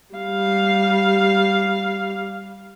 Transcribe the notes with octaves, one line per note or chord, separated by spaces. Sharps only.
G3 F5